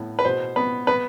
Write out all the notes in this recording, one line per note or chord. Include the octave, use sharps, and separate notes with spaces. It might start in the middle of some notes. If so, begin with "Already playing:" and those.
Already playing: A2 B3
B4
B2 C5
B3 B4
B3 B4